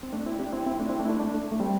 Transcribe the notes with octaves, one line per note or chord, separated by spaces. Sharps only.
C4
A3 D4
C4 E4
D4 G4
C4 E4
C4 E4
A3 D4
C4 E4
A3 D4
E4
A3 D4
A3 D4
A3
G3 C4